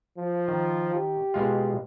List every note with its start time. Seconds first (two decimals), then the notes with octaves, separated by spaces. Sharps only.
0.18 F3
0.48 D#3
0.95 G4
1.34 B2 G#3 F4